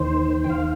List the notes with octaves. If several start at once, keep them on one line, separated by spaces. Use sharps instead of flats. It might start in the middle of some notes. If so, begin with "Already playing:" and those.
Already playing: D#2 D#3 C5
G5
D#2 D#3 F5